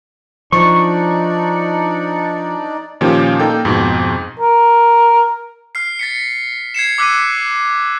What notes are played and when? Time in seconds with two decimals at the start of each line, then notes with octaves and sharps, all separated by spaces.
0.52 F3 D4 D#4 D5 C#6
3.01 A#2 D#3 F3 C#4 G4
3.40 A#3 D#4 A4 G5 G6
3.65 F2 G#2 B2
4.39 A#4
5.75 F6 C7
5.99 A6 B6 C#7
6.74 G#6 C7 C#7 E7
6.98 D6 E6 F#6 B6 C#7 D#7